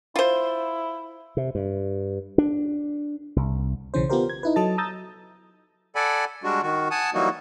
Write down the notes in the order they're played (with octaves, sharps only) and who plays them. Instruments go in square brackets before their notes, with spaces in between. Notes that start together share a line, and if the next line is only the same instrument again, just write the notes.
[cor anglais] E4 [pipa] F4 C5
[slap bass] C3
G2
D4
C2
[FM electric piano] B1 C#3 E3 C#4 C5
B3 F4 G4 A#4 C5
G#6
D#4 E4 B4
F#3 A4 D#5 A5 A6
A#5 D#6 E6 G6 A6
[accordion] A4 D5 F#5 G#5 B5
G3 G#3 D4 F#4
D#3 F#4
F#5 G#5 A5 D#6
E3 F#3 G3 A#3 D#4 F#4